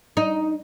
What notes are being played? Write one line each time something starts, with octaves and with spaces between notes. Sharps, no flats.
D#4